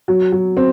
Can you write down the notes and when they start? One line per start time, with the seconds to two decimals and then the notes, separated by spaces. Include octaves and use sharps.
0.08 F#3
0.32 F#3
0.57 C4